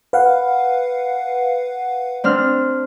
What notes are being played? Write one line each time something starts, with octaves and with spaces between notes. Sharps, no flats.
B4 F5 F#5
C4 D4 F6